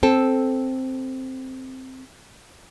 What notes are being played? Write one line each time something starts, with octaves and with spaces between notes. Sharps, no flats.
C4 A4